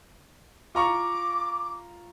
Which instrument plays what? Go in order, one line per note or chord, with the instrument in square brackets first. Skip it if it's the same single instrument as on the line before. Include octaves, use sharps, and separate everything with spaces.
[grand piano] F4 A#5 C#6 [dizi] D6